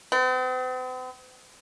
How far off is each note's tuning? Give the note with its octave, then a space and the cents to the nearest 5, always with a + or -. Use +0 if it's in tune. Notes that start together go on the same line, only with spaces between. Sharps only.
C4 -45